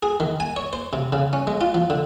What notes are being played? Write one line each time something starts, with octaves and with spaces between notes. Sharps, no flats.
G#4
D#3
G#5
C#5
C5
C3
C#3
C#4
G#3
F4
F3
D3